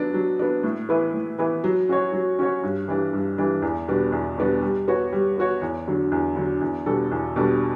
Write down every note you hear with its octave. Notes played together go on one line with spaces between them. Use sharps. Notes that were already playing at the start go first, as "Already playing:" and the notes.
Already playing: F#3 B3 D4
F#3
B3 D4
A2
E3 B3 E4 B4
A2
E3 B3 E4 B4
F#3
C#4 F#4 C#5
F#3
C#4 F#4 C#5
G2
E3 G3 D4
G2
E3 G3 D4
E2
B2 G3 B3 D4
E2
B2 G3 B3 D4
G3
B3 F#4 C#5
G3
B3 F#4 C#5
E2
D3 F#3
E2
D3 F#3
E2
B2 G3 D4 A4
E2
B2 G3 D4 A4